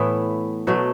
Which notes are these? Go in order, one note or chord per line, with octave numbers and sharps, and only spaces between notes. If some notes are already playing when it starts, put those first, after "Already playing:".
Already playing: A2 E3 A3 B3 E4
B2 F#3 A3